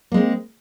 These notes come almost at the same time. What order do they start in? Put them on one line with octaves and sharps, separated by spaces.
A#3 G#3 C4